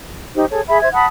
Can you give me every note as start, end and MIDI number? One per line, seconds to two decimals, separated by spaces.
0.34 0.45 63
0.34 0.45 67
0.34 0.45 72
0.50 0.61 68
0.50 0.61 69
0.50 0.61 73
0.67 0.80 68
0.67 0.80 76
0.67 0.80 83
0.81 0.88 72
0.81 0.88 76
0.81 0.88 92
0.93 1.06 78
0.93 1.06 81
0.93 1.06 83
0.93 1.06 87